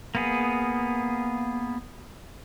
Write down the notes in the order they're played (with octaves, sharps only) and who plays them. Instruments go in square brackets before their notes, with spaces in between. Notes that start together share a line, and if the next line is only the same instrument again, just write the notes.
[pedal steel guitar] A#3 B3 G#4